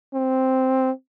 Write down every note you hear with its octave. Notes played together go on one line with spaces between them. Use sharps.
C4